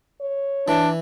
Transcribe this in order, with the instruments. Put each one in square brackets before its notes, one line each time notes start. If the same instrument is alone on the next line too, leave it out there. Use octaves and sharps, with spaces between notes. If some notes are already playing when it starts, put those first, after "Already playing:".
[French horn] C#5
[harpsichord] E3 [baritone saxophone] D4